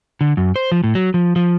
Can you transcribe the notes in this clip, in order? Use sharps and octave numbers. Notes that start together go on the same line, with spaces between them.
D3
F#2
C5
F3
A2
F#3
F3
F3